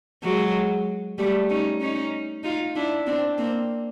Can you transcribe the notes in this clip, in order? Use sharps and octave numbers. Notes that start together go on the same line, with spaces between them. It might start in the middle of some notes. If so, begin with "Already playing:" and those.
F#3 G#3
G3 A3
C#4 D#4
C#4 D#4
D#4 F4
D4 E4
C4 D4
A#3 C4